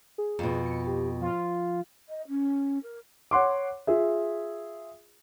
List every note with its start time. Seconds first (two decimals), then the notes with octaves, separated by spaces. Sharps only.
0.18 G#4
0.39 F2 B2
0.66 C#7
0.87 G4
1.21 F3 F4
2.08 D#5
2.28 C#4
2.83 A#4
3.31 C#5 F#5 C6 D6
3.87 F4 G#4 E5